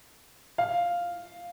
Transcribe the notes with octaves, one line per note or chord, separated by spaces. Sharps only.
F5